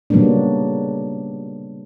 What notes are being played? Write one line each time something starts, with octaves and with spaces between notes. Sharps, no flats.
C#3 F#3 G3 A#3 B3 D4